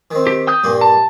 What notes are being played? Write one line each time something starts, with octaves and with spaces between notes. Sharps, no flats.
D#3 C4
G4
G5 D#6 G6
G2 A#2 A#3
A5